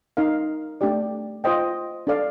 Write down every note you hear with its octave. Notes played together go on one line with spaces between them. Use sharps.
D#4 A#4 F5
A3 D4 G4 D5
F4 C5 D#5 G5
D4 A4 D5 F5